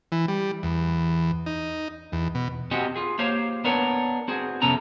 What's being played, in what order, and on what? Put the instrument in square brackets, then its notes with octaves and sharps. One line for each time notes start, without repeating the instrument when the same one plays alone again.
[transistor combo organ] E3
G3
E2
D#4
E2
B2
[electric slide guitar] C4 F#4 G4 D#5 G#5
F4 G#4
A#3 G4 C5 C#5 F5
B3 D4 A#4 B4 C#5
C4 F#4 G#4
F2 C3 B3 C#4 A4 A#5